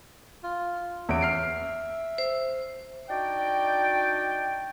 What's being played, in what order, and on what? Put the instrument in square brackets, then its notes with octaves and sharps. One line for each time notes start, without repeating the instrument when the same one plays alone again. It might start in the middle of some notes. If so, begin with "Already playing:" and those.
[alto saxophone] F4
[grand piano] E2 C#4 D7 [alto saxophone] E5
[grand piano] F6 C7 D7
[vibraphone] C5
[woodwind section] D4 D#4 F#4 D5 G5